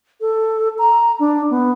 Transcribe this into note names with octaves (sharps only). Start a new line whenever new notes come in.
A4
A#5
D4
B3